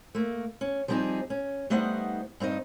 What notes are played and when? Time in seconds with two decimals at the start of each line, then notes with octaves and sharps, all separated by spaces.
0.15 A3 A#3
0.61 C#4
0.88 F3 G3 B3 C4 D#4 G#4
1.30 C#4
1.70 G3 A3 B3 D#4 C5 F#5
2.40 G2 C4 D#4 D#5